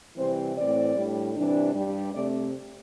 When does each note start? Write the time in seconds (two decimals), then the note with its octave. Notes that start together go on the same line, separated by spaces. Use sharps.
0.17 C3 E3 G3 C4 C5
0.57 A2 E3 C4 D5
0.95 A2 G3 D4
1.35 C3 E3 G3 D4
1.74 G2 G3 D4
2.13 C3 A3 C4 D5